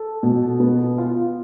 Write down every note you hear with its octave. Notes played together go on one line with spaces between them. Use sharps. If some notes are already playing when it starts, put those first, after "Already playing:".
Already playing: A4
B2
B3
F4